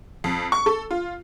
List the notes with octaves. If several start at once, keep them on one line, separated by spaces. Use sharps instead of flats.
F2
C#6
A4
F4